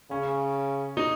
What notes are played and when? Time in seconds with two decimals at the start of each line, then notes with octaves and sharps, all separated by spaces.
0.11 C#3 C#4
0.97 D#4